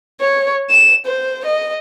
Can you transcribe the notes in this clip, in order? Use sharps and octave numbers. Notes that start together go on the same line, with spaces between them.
C#5
E7
C5
D#5